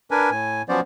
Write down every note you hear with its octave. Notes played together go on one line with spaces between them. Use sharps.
D4 A#4 B4 G#5
A2 G#5
F3 F#3 B3 C#4 C5 D5